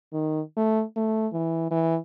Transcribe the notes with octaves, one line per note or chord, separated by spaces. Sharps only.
D#3
A3
A3
E3
E3